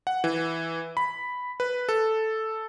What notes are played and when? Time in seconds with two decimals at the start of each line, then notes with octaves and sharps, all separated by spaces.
0.07 F#5
0.24 E3
0.97 B5
1.60 B4
1.89 A4